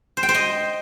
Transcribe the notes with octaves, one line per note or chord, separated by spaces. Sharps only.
C5
G5
C5
D#5